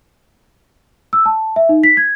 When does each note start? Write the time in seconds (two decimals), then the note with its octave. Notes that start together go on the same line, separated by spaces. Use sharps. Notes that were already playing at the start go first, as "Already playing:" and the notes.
1.13 E6
1.26 A5
1.56 E5
1.69 D#4
1.84 B6
1.97 G#6